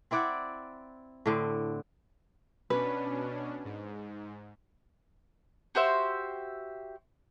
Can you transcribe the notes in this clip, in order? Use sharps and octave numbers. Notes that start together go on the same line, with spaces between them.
C4 E4 D5 F#5
A2 D3 C4
B2 C#4 D4 B4
G#2
F#4 G4 C5 E5